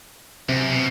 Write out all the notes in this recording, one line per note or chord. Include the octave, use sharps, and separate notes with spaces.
F#2 C3
B2